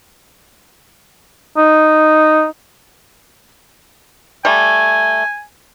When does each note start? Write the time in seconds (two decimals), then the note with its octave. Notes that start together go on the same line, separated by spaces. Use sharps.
1.57 D#4
4.45 G3 A3 G#5